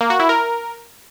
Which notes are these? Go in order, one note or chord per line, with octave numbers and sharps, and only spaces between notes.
A#3
F#4
E4
A#4